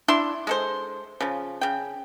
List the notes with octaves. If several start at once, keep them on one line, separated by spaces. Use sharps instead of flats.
D4 E4 C6
G#3 A4 C5
C#3 F3
C#3 G5